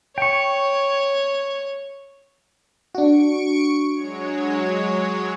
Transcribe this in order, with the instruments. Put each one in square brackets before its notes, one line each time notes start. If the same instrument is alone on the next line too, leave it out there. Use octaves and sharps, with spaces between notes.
[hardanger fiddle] C#5 [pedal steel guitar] G5 C#6
[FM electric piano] D4 F#4 [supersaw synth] C#6 C#7 D7
[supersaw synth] F#3 G#3 C#5